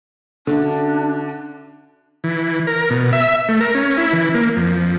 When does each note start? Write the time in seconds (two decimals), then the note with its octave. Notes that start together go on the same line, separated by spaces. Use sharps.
0.47 D3 C#4 D4 F#4 E5
2.24 E3
2.67 A#4
2.90 B2
3.13 E5
3.48 A3
3.61 A#4
3.75 C#4
3.98 E4
4.13 E3
4.34 A#3
4.56 F2